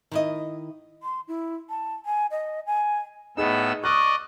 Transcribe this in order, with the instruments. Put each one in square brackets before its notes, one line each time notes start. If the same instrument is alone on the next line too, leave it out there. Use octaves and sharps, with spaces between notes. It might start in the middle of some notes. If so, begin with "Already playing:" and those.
[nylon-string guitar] D#3 E4 D#5
[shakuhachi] C6
E4
A5
G#5
D#5
G#5
[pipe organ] A2 B3 E6 [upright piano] D#4 G#4
[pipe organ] D5 D#5 [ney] C#6 [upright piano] D#6 F6 F#6